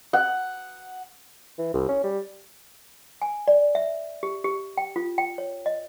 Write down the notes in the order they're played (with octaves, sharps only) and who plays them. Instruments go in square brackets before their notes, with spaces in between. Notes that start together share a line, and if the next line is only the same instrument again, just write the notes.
[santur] F#5
[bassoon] E3
C2
C#4
G3
[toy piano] G#5
D5
E5
G4
G4
G5
F4
G5
C#5
D#5